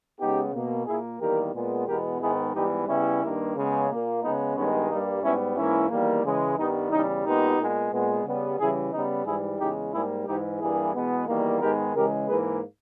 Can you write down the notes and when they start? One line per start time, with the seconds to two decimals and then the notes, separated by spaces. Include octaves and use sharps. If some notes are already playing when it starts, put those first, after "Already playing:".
0.20 C#3 G#3 B3 D#4 G4
0.53 B2 A#3
0.86 A#2 A#3 E4 G#4
1.20 E2 D#3 G3 A#3 G4 A#4
1.54 A#2 G#3 B3
1.87 E2 B2 G#3 B3 G4 A#4
2.21 G#2 D#3 G#3 B3 E4 G#4
2.54 G#2 E3 G3 B3 D#4 G4
2.87 C#3 G3 B3 C#4 E4
3.21 G2 D#3 A#3
3.55 C#3 G#3 B3
3.89 A#2 A#3
4.22 C#3 G#3 B3 D#4
4.56 G2 D#3 G#3 B3 C#4
4.89 G2 G3 A#3 D#4
5.23 G#2 G3 B3 C#4 E4
5.56 G#2 E3 A#3 C#4 E4
5.90 E2 D#3 G3 A#3
6.23 C#3 E3 G#3
6.57 G2 D#3 G3 B3 D#4
6.91 E2 C#3 G3 D#4
7.24 A#2 G#3 B3 D#4 G4
7.57 A#2 G#3 B3
7.91 A#2 G#3 B3
8.24 C#3 G3 B3
8.58 C#3 E3 G3 E4 G#4
8.92 C#3 G3 B3 D#4
9.25 G#2 E3 G3 E4 G#4
9.59 E2 C#3 G#3 D#4 G4
9.92 G#2 G3 A#3 E4 G#4
10.26 G#2 E3 G#3 D#4 G4
10.60 G2 E3 G3 A#3 E4 G#4
10.94 E2 B2 G#3 B3
11.27 E2 D#3 G3 A#3
11.61 G#2 D#3 G#3 B3 G4 A#4
11.94 C#3 E3 G#3 G4 A#4
12.27 G#2 E3 A#3 G#4 B4